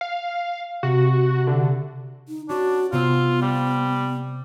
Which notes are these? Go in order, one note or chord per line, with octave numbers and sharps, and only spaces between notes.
F5
C3 F#4
D3
D#4
C#4 D4 F#4
C3 B3 F4 C5 E6
G3 C5